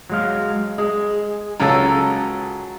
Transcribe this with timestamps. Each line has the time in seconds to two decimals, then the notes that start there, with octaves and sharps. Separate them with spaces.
0.10 F#3 G#3 F5
0.78 G#3 G#4
1.60 C#2 F#3 C#4 A4 A5 A#5